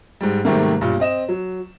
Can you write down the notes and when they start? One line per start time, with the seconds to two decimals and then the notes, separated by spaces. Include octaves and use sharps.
0.21 G#2 G3
0.45 G#2 C3 D#3 G3 A3 A#3
0.81 B1 G2 A#2
1.00 C4 D#5 E7
1.29 F#3